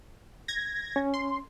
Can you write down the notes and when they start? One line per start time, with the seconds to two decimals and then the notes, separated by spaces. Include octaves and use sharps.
0.48 G#6 A#6
0.96 C#4
1.14 C6